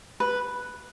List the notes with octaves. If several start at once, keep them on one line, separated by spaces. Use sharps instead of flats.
B4